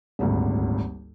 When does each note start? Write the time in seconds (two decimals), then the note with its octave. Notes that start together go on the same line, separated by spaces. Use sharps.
0.19 D#1 G#1 D2